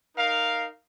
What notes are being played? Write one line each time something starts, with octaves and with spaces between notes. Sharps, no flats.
D#4 A#4 F5